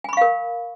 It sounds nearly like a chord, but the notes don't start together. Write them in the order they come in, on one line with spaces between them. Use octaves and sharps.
G#5 B5 C#6 F5 A#4